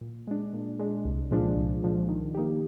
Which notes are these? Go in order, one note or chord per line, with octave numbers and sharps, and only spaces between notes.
A#2
G#3 D4
A#2
G#3 D4
C2
A#2 F3 G#3 D4
C2
A#2 F3 G#3 D4
D#3
A#3 D#4 G4